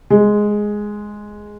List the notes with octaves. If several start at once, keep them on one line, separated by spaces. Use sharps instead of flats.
G#3